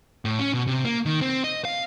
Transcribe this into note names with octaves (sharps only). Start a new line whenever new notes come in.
A2
C#4
B2
C3
A#3
D#3
C4
D#5
F5